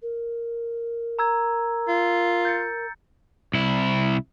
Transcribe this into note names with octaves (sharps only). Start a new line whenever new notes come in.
A#4
A#5 E6 G#6
F4
G6 A6 C#7
C2 E4